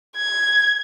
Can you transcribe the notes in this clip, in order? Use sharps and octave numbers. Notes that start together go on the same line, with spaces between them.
G#6